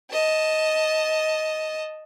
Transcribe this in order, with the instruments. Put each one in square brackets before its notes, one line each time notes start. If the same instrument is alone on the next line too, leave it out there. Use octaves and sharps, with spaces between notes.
[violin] D#5 A5